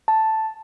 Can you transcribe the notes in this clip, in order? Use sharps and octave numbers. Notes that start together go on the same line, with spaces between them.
A5